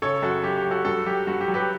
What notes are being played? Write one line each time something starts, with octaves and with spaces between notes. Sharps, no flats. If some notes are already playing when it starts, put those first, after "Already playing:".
C#3 A4 C#5
F#2 F#4 A4
F#2 G4
G4
F#2
F#4 A4
G2 F#4 A4
F#3 G4
G2 F#4
G4
F#3
G4 B4